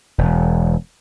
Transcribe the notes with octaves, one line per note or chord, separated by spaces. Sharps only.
E1